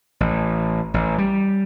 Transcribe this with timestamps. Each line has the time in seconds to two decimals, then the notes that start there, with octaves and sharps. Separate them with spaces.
0.20 A1
0.94 A1
1.18 G3